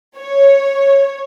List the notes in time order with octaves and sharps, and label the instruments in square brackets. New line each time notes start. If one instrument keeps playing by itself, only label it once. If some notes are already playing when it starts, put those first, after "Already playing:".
[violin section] C#5